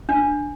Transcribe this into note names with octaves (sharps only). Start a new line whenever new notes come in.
D4